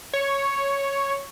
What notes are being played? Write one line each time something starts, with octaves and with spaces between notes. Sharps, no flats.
C#5